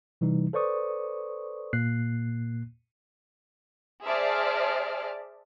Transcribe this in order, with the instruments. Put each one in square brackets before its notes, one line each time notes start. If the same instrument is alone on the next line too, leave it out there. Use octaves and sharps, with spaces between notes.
[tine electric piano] C3 E3 G3 D#4
A4 B4 C5 D5 C#6 D#6
A#2 A#3 F#6 C7
[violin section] G#4 C5 D5 E5 A5 F6